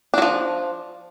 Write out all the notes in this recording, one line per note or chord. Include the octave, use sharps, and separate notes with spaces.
F3 F#3 D4